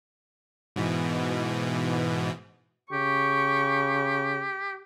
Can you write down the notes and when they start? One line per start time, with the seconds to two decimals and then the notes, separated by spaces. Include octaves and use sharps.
0.76 G#2 B2 E3
2.92 C#3 G4 C#6